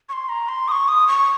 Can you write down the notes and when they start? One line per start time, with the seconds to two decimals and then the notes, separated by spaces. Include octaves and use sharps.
0.09 C#6
0.13 C6
0.29 A#5
0.49 C6
0.68 D#6
0.72 C#6
0.88 D#6
1.07 C#6